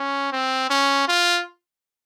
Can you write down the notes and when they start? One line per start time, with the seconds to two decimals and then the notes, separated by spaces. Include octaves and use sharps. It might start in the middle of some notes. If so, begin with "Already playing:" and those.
Already playing: C#4
0.32 C4
0.70 C#4
1.08 F4